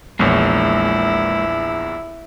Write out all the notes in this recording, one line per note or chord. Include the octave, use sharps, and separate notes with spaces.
A#1 E2 G#3 A#3 E4 C#5